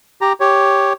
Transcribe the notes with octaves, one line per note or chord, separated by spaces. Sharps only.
G4 A#5
G4 C#5